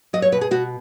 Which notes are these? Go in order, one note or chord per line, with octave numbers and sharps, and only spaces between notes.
F#3 D#5
C#5
B2 B4
G#4
B2 F#4